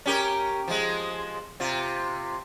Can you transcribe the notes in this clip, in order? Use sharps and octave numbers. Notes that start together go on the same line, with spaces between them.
C#4 G4 A#4
F3 G#3
C3 F4